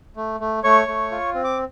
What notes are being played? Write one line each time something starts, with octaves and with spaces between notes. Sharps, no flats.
A3
A3
A3 C#5 C#6
A3
F4
C4
D6